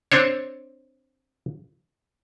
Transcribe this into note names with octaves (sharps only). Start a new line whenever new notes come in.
C4 D4 C5 C#5